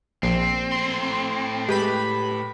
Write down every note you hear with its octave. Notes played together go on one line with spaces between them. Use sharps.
A#1 C4
A2 C6
G#3 G4 B4 B5